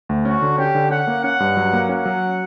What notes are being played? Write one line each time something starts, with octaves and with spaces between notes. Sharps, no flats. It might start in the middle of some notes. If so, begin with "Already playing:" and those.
D2
C#4 F#4
D3
C#4 G4
D3
C#4 F#5
A#3
C#4 F#5
G2
F#3
A#3
C#4 F#5
F#3